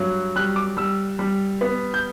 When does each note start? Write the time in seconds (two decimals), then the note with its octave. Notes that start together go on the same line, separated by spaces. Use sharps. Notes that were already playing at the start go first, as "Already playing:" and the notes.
Already playing: G2 F#3
0.36 G3 F#6
0.56 D6
0.77 G3 E6
1.19 G3
1.61 B3
1.94 G6